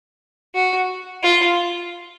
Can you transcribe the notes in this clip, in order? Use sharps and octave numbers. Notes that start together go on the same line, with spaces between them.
F#4
F4